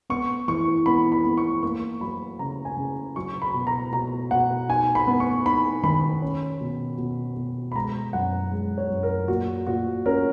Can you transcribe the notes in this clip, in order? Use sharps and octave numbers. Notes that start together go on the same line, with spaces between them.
B3 C#6
E3 C#6
B3 B5
B5
B3
C#6
A#3 C#6
F#3 B5
C#3 A#5
G#5
C#3
F#3 C#6
B5
B2
A#5
B2 A#5
B2 F#5
D#4 G#5
B5
B3
C#6
D#4 B5
D#3 B5
C#4
B2
B2
B2
B5
G#3 A#5
F#2 F#5
G#3
C#5
F#2
A#4
A#2 F#4
A#2 F#4
C#4 A#4